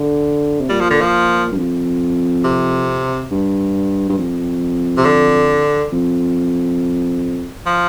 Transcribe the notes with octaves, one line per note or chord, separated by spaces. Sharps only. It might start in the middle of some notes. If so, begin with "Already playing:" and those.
Already playing: D3
C3
A#2 G3
F3
D3
F3
G2
F2
C3
G2
G2
F2
C3
D3
F2
F3